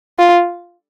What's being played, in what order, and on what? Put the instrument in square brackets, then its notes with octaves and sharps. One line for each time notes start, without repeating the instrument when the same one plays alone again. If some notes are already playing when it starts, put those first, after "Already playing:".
[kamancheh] F4